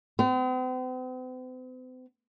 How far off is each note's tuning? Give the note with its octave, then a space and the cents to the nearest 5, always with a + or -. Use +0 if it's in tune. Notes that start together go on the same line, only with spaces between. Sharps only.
C4 -45